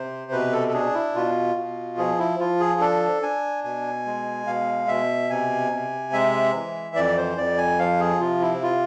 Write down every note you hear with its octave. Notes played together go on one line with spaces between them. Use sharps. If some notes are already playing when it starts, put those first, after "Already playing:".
Already playing: C3 C5
B2 B4
A4
A4
D4 G#4
E4
B2 F4
B2
F3 G#4
E4
F3 F4
G#4
D4 A4
D4 G#5
B2 G#5
G#3
B2 F5
B2 E5
C3 G#5
C3
G#3 E5
E3
F2 D5
C5
F2 D5
G#5
F3 F5
G#4
C3 F4
E4
F4